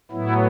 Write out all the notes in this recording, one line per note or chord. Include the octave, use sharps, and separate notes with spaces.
A2 F#3 B3 E4